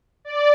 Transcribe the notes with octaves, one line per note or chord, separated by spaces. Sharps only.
D5